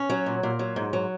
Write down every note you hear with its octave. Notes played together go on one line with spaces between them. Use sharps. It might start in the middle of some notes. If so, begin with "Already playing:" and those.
Already playing: C#4
F#3
A#2
A#2
F#3
G#2
F#3